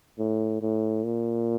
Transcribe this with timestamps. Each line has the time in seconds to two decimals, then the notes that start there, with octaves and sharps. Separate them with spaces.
0.18 A2
0.61 A2
1.04 A#2